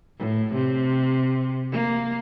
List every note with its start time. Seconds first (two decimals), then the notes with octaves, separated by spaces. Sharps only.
0.18 A2
0.54 C3
1.71 A#3